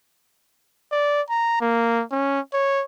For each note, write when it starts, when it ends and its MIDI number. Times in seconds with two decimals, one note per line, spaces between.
0.92 1.21 74
1.29 1.56 82
1.61 2.03 58
2.12 2.40 61
2.53 2.84 73